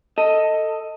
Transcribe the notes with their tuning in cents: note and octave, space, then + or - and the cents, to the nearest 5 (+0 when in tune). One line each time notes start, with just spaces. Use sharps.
A4 +15 D#5 +10